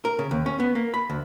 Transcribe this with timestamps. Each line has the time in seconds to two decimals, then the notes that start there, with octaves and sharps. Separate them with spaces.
0.05 A#4
0.19 C#3
0.31 D#2
0.46 C#4
0.60 B3
0.75 A#3
0.94 B5
1.10 D2